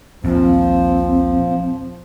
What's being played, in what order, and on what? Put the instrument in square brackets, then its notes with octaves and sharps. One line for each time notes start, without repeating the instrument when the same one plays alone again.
[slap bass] A#1 D#2 [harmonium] F3 [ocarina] C4